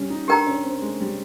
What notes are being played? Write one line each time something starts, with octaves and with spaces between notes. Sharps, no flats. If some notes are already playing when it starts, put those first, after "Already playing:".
Already playing: G3 C#4
D#4
D4 G4 A#4 D#5 G5 A#5
C#4
C4
G#3
G3